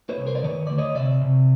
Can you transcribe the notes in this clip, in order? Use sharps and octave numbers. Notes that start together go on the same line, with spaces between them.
B4 C#5
C2
A#4 C5
D5
D#3 B4 C#5
D2 D5
C#5 D#5
C3 D5 E5
C3